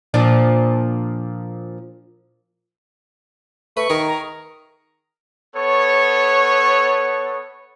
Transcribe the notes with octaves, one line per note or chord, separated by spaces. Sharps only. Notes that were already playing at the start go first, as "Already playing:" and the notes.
A#2 F3 D4
A3 B4 C#6
D#3 G#4 A#4
A#5
B3 A4 C#5